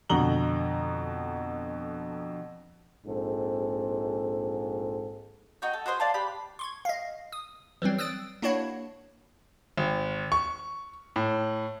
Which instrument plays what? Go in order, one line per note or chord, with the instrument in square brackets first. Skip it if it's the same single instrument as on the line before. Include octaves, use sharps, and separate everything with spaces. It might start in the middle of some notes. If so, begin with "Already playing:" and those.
[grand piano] F2 B2 D3 A#5 F#7 G7
[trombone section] A#1 G#2 C4 A4
[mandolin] D#4 F#4 G5
A4
F#4 G#4 C5 D#5
D5 F5 A5
G4 B5 F#6
[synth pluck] C6 C#6 G#6
D#5 F5
D#6
E3 F#3 G3 C4
D#6 E6 F#6 A6 D7
A#3 D4 E4 F#4 C#5 F#5
[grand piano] G#1
C#6
A2